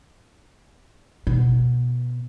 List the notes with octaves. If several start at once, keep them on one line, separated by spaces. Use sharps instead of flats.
B2